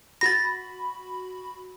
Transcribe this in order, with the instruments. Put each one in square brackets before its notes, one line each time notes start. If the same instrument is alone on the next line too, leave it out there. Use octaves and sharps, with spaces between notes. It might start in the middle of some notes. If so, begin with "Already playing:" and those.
[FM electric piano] F#4 B5 [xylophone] A6 A#6